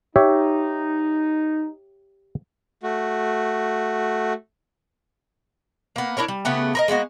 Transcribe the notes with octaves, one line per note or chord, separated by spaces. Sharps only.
D#4 G4 C#5 E5
A3 F#4
A#3 B3
D4 E4 A#4 C#5
G3
C#3 A3 B3 G4
A#4 B4 D#5
G#3 A#3 B3 F#4